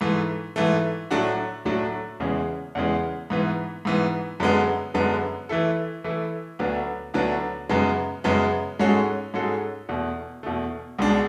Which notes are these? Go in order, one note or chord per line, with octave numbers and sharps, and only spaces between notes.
G#2 E3 A3
G#2 E3 A3
A2 F#3 A3 D4 F#4
A2 F#3 A3 D4 F#4
E2 C#3 E3 G#3
E2 C#3 E3 G#3
G#2 E3 B3
G#2 E3 B3
F#2 D3 G#3 B3
F#2 D3 G#3 B3
E3 A3 E4 A4
E3 A3 E4 A4
D2 D3 F#3 B3 D4
D2 D3 F#3 B3 D4
F#2 C#3 G#3 B3
F#2 C#3 G#3 B3
G#2 G#3 C#4 F#4 A4
G#2 G#3 C#4 F#4 A4
E2 B2 A3
E2 B2 A3
C#2 B2 G#3 D4